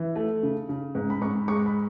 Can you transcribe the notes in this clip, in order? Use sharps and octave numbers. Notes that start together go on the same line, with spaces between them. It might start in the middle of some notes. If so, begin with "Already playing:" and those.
Already playing: E3
A3
C#3
C#3
G#2
B5
G#2 C#6
G#3 C#6
B5